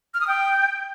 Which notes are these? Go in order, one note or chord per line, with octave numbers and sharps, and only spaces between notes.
F6
D#6
G5